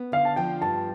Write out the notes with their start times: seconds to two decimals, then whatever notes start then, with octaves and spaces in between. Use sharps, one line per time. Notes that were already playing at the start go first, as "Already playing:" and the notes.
Already playing: B3
0.12 D3 F5
0.25 A5
0.36 F3 G5
0.62 G2 A5